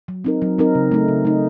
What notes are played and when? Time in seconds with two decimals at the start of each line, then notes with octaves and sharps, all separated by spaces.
0.08 F#3
0.24 C4 D#4 A#4
0.42 F#3
0.58 C4 D#4 A#4
0.75 C#3
0.92 A3 D#4
1.08 C#3
1.25 A3 D#4